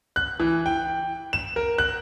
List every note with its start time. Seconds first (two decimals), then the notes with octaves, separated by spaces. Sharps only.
0.16 F#6
0.40 E3
0.66 G5
1.33 E7
1.56 A#4
1.78 F#6